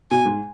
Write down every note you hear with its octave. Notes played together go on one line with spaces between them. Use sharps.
B2 G#5
G#2